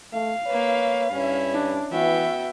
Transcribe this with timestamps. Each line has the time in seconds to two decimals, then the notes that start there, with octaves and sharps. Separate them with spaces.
0.13 A3 F5
0.46 A#3 B4 C#5
1.11 G2 C#4 E4
1.53 D4
1.91 E3 B3 F#4 E5 G5